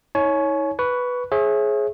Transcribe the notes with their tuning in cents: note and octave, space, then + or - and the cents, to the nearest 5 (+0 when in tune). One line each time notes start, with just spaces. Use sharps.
D#4 +45 C#5 +0 G#5 +40
B4 +0 C#6 +20
G#4 +15 C#5 -40 E5 +0